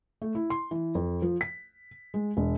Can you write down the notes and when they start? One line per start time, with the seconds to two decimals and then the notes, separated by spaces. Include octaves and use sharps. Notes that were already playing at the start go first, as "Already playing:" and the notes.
0.22 A3
0.35 E4
0.50 C6
0.71 E3
0.95 F2
1.22 F3
1.41 B6
2.14 G#3
2.37 E1